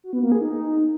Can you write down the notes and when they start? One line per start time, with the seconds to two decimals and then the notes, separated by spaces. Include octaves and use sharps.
0.04 F#4
0.13 B3
0.22 A#3
0.32 G#4
0.41 D#4